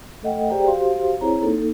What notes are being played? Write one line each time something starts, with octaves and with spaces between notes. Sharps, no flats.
A3 A4 D#5 F#5 G5
G4 G#4 C5 D5 G5 A#5
F#4 G4 C5 F5 C6
C4 E4 G#4 C5 C#5 A#5
A#3 D#4 A4